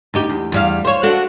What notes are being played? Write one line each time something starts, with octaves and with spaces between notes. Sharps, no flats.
D2 D#4 G4
E2
E2 G3 F5
C5 C#5
D4 F#4 A4